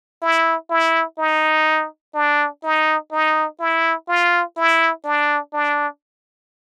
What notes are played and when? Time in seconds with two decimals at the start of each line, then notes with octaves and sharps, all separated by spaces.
0.22 E4
0.70 E4
1.18 D#4
2.15 D4
2.63 D#4
3.12 D#4
3.60 E4
4.08 F4
4.57 E4
5.05 D4
5.53 D4